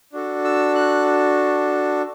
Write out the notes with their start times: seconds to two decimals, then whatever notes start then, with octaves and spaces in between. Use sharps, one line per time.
0.13 D4 F#4 A4
0.44 E6
0.75 F#6